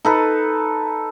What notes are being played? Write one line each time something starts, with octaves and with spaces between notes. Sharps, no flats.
D#4 A4 B4